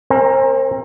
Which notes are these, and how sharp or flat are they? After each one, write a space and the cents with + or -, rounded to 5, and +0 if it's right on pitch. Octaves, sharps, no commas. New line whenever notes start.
C4 +35 A#4 +0 G#5 -30